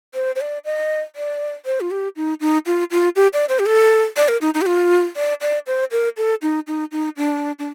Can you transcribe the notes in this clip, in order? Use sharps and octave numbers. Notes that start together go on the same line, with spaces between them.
C5
C5
D5
D#5
D5
C5
F4
G4
D#4
D#4
F4
F4
G4
D5
C5
G4
A4
D5
A#4
D#4
D#4
G4
F4
D5
D5
C5
A#4
A4
D#4
D#4
D#4
D4
D4